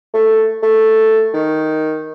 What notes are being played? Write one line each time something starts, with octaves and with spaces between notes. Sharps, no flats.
A3
A3
D#3